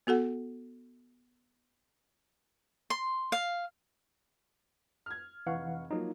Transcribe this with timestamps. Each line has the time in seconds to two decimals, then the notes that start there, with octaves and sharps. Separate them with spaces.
0.07 B3 F#4 A4 F#5
2.90 C6
3.32 F5
5.06 F6 G#6
5.47 F1 E3 F5 F#5 C#6
5.91 F3 F#3 A#3 D#4